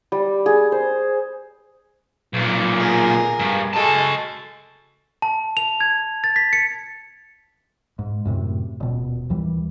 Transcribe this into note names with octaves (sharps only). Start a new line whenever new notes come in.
G3
G#4
C5
B1 A#2
G#4 A#4
G2
G#3 F#4 A4 A5
A5
F7
G#6
A6
B6
C#7
G#2
F#2 A2 C3
D#1 B2
D#2 E3 G3